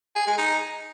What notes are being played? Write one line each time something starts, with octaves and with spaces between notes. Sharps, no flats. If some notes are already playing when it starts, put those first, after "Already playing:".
G#4
G#3
D#4